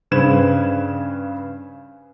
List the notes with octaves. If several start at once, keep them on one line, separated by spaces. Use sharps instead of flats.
G2 C#3 B4 C5 G#6 E7